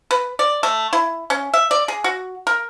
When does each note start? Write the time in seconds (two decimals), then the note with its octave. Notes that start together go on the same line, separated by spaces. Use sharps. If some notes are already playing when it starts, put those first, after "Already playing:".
0.11 B4
0.39 D5
0.63 A3
0.93 E4
1.30 C#4
1.54 E5
1.71 D5
1.88 G#4
2.04 F#4
2.47 A#4